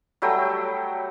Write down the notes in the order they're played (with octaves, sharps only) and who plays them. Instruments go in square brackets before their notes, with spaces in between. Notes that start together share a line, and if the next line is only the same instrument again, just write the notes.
[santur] F#3 G3 A3 G5